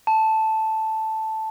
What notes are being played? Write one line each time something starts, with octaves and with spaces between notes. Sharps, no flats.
A5